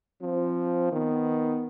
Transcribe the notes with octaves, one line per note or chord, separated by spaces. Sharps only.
F3 C4
D#3 B3